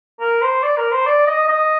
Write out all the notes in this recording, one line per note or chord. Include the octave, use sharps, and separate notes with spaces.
A#4
C5
D5
A#4
C5
D5
D#5
D#5